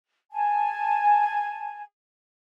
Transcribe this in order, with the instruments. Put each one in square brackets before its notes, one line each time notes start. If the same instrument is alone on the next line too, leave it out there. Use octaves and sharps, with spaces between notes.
[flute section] G#5 A5